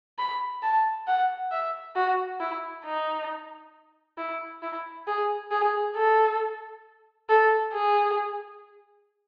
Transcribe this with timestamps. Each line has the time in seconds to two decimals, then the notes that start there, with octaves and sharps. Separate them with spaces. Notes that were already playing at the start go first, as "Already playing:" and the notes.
0.19 B5
0.63 A5
1.07 F#5
1.51 E5
1.96 F#4
2.40 E4
2.85 D#4
4.18 E4
4.62 E4
5.07 G#4
5.51 G#4
5.96 A4
7.29 A4
7.73 G#4